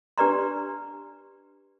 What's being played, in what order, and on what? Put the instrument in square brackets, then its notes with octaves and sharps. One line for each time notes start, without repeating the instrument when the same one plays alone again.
[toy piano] D4 G4 B4 D5 A#5 C6